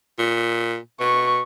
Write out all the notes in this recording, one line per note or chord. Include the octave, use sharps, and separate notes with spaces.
A#2
B2 C#6